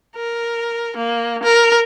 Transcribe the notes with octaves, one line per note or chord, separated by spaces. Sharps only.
A#4
A#3
A#4